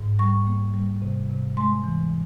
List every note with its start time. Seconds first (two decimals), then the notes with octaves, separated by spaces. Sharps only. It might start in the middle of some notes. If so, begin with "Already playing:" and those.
Already playing: G#2
0.19 G3 C#6
0.47 A#3
0.74 G3
1.02 C3
1.29 C3
1.57 G#3 C6
1.84 E3